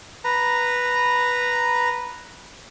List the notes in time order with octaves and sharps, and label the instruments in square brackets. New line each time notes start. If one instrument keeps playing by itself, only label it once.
[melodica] B4 A#5